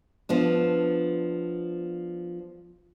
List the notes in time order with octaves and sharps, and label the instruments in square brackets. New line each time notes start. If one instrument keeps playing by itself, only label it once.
[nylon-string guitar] F3 B3 D4